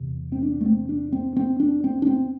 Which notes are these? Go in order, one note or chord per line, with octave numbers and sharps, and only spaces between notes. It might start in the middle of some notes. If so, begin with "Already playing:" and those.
Already playing: E2 C3
C4
D4
A3
C4
D4
C4
C4
D4
C4
D4
C4